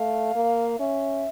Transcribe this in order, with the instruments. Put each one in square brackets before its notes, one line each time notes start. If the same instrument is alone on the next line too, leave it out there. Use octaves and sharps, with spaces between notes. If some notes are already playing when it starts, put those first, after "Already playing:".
Already playing: [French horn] A3 [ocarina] F5
[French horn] A#3
[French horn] C#4 [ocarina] E5